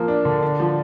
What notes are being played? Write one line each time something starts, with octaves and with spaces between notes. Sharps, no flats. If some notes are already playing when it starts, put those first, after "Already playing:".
Already playing: F3 A#3
D4
D3
D4
F3